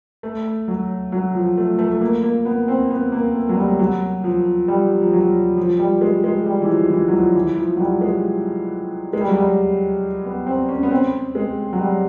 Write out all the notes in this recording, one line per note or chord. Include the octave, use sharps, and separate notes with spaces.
A3
F#3
F#3
F3
A3
A3
A3
A#3
A#3
B3
C4
B3
A#3
A3
F#3
G3
F#3
F3
G3
F3
F#3
F3
G3
G#3
G#3
G3
E3
F3
E3
F#3
F3
E3
F3
F#3
G3
G#3
G#3
G3
F#3
G3
B3
C4
C#4
B3
C4
G#3
F#3
G3